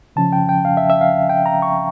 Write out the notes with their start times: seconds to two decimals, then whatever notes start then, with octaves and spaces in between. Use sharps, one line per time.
0.16 C#3 F3 C#4 A5
0.33 G5
0.49 G5
0.65 F5
0.77 E5
0.90 E5
1.01 F5
1.29 G5
1.46 A#5
1.62 C#6